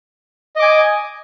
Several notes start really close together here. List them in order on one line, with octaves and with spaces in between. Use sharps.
D#5 D6 G#5